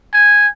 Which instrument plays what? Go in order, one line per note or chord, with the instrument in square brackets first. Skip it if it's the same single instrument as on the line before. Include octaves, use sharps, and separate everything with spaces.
[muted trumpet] G#5